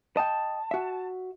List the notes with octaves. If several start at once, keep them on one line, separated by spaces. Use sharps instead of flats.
D#5 G5 A5
F#4 E5